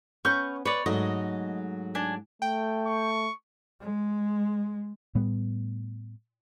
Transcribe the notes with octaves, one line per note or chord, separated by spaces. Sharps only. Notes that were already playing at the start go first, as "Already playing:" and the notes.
B3 C#4 C#6 F6 G6
B4 C#5 D5
G#2 F#3 A3 D#5
D4 G#5
A3 G5
C#6
G#3
A2 G3 B3